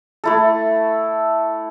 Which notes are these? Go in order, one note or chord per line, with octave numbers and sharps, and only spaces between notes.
A3 E4 A4